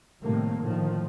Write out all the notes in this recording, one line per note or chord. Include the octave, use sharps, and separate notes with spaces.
A2 C3 D#3 G3 A3 A#3
A2 D3 D#3 F3